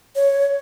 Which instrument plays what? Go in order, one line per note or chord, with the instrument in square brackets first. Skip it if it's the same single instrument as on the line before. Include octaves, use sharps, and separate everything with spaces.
[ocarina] C#5